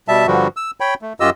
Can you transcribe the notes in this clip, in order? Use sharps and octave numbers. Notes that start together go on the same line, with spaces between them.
B2 G3 E5 A5
G2 D3 F3 G3 F#4
E6
C#5 G5 B5
A3
F#2 F4 G4 D#5 E6